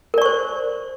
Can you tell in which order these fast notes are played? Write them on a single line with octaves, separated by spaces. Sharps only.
A#4 D5 C#6 C5